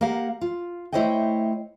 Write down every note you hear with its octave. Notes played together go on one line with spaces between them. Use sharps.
A#3 G4 A#4 F5 F#5
F4
A3 E4 C5 C#5 D#5 G5